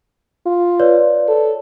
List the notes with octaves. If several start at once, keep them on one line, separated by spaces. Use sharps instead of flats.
F4
B4 C#5 D5
A4